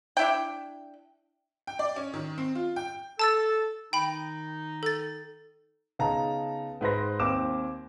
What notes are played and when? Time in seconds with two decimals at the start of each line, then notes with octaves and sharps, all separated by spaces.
0.17 D4 E4 G5
1.67 G5
1.79 D5
1.96 C#4
2.14 D#3
2.38 C4
2.55 F4
2.76 G5
3.19 A4 A5 E6 A6
3.93 D#3 D#4 G5 B5
4.83 A4 A6
5.99 C#3 B3 D#4 A5 A#5
6.81 G#2 B4 C5 A#6
7.19 D#2 C4 D6 E7